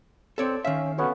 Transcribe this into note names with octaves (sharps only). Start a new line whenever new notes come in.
C4 A4 C#5 D5
D#3 C#4 E5 F5
B3 C#4 F#4 A4